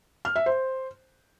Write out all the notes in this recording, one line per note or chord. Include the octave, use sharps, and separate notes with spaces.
F6
E5
C5